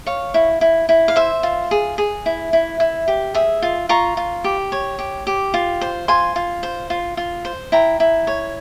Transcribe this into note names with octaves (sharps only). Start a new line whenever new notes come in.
C#5 F5
E4
E4
E4
F5
C5 E5
F4
G#4
G#4
E4
E4
E4
G4
G#4 E5
F4
F4 A#5 C#6
F4
G4
C#5
G4
G4
F4
C5
F4 G#5 C6
F4
C5
F4
F4
C5
E4 G5 A#5
E4
C#5